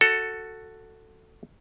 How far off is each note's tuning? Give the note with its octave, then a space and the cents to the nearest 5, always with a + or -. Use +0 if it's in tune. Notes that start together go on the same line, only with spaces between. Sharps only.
F#4 +0 A4 +10